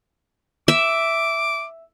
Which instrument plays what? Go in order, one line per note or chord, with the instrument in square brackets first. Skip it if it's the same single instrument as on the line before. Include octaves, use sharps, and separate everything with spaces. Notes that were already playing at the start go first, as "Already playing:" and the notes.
[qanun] E5 [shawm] D6